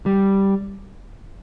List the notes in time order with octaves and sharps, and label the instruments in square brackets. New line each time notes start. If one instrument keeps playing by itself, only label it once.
[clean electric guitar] G3